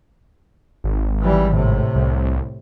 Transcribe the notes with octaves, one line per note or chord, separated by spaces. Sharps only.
G#1
E3 G3
A2 C3
C2